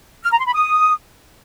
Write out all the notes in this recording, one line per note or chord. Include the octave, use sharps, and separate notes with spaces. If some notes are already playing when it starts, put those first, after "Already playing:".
F6
A#5
C6
B5
D#6